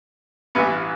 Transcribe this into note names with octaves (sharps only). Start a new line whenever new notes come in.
A1 G2 E3 B3 E4